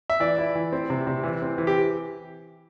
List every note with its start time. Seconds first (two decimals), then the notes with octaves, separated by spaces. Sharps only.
0.10 E5
0.20 E3 D5
0.38 E4
0.55 E3
0.73 C4
0.90 C3
1.07 C3
1.24 E3
1.42 C4
1.58 E3
1.67 G4